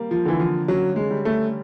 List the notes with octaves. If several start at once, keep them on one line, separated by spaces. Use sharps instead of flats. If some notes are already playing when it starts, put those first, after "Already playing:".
Already playing: G3 A#3
F3
D3 E3
F3
F#3 C#4
G#3
G3
A3